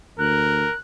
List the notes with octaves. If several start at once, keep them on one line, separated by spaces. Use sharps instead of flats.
D2 A#4 F#6